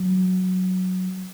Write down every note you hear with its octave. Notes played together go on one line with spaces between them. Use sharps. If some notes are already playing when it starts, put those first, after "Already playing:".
Already playing: F#3